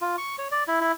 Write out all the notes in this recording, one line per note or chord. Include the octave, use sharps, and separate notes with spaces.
F4
C#6
C#5
D5
E4
E4